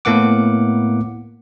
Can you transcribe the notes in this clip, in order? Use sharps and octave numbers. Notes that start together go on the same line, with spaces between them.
A2 A#3 B3 F#5 D6